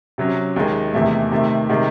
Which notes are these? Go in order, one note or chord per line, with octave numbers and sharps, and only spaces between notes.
C3 F#3 C#4
D#2 D#3 G#3
E2 C3 D#3 A3
C3 D#3 A3
C3 D#3 G#3